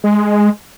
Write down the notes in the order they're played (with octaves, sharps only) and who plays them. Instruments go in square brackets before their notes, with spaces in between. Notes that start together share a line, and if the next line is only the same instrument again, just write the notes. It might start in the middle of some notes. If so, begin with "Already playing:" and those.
[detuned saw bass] G#3